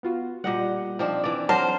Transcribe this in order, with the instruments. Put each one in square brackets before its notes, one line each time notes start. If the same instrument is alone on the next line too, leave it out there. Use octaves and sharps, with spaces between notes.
[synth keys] B3 F4 F#4
[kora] A#2 D#5 F#5 [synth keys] G3 G6
[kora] F3 C4 D4 [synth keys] D#4
[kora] E3 D5
[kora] F#3 A#4 [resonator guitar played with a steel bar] C5 [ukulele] A5 [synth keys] F6